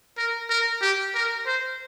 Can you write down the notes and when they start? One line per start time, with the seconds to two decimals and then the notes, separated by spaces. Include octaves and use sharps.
0.18 A#4
0.50 A#4
0.82 G4
1.15 A#4
1.47 C5